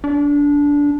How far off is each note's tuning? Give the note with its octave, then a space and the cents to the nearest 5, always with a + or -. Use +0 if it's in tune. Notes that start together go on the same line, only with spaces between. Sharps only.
D4 -20